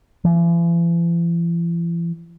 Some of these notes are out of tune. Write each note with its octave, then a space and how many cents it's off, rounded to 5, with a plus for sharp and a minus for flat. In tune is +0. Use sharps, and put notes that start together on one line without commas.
E3 +45